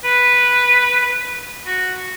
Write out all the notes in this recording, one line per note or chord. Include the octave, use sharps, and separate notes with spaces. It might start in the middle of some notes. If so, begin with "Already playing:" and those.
B4
F#4